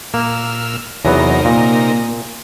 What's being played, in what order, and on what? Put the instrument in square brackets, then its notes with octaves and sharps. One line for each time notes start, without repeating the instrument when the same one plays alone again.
[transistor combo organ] A#2 E6 F6 [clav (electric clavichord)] A#3
[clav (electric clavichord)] E2 F#3 B3 [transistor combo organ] C3 D#4 A#4 [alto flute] C#5
[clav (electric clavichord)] A#2 [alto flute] A#3